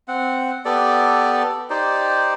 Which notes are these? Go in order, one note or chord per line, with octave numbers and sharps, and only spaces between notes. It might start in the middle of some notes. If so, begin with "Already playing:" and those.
C4 F#5
B3 G4 A4 D5
D#4 G4 C5 D5